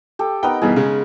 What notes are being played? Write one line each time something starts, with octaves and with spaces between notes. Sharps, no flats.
G4 A4
B3 D#4 A#4 G5
G2 B2 E3 G#4
C#3 G#3